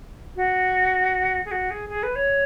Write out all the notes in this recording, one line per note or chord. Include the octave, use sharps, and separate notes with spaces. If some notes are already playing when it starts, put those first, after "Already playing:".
F#4
G#4
F#4
G#4
G#4
B4
C#5